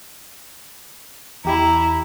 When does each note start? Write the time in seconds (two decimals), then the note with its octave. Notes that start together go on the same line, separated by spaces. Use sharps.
1.45 E2 E4 G4 A#5